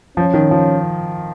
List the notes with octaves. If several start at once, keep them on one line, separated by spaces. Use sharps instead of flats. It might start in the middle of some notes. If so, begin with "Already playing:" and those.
F3 C#4
D#3
F3